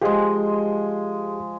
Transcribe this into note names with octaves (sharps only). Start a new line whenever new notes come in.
F3 G#3 G4 G#4 D#5